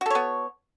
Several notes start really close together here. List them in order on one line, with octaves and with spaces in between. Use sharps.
F#4 A4 C#5 B3